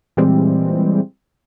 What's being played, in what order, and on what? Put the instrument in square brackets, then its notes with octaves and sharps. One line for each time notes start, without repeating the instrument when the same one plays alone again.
[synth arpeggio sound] A#2 E3 G3 G#3 C4